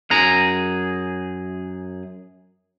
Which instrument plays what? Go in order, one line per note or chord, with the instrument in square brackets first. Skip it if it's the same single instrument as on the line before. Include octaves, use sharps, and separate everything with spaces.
[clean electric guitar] F#2 G#4 A#5